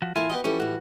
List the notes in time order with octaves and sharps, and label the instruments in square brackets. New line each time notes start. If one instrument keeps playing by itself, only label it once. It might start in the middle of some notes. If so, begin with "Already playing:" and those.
[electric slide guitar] F3 F#4
[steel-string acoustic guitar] A2 A#3 A5 [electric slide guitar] E3 F4 G#5 [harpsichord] E4
[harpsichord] B3 G4 D#5 [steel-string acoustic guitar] F#4
[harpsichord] E3 G3 [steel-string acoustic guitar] F3 A3 A4 [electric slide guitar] C#4
[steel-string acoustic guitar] A2 F3 [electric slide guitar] F#4